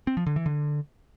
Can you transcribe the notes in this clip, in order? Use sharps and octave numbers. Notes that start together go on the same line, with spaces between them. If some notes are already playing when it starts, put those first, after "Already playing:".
C4
F3
D3
E3
D3